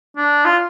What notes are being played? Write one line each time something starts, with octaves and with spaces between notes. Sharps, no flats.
D4
F4